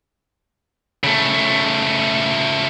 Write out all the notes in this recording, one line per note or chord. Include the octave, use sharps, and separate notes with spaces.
C#3 A3